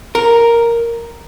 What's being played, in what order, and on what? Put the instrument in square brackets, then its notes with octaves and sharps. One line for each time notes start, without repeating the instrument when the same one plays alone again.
[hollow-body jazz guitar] A#4